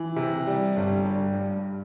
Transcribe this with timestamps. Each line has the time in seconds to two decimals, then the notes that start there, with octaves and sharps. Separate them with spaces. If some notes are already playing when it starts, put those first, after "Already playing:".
Already playing: E3
0.17 C3
0.47 G3
0.76 G1
1.05 G3
1.34 G2